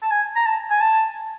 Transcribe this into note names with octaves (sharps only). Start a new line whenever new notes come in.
A5
G#5
A#5
A5
G#5
A5